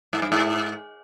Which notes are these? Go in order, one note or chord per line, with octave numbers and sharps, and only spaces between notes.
G#2
G2
G#2